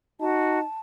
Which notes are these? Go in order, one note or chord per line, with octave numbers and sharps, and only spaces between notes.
D#4 F#4 A5